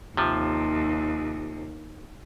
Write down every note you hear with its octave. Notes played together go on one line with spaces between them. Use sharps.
D#2 C3 F3